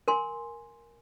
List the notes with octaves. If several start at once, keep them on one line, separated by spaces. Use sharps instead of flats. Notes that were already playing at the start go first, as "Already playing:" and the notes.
A#4 G#5 C6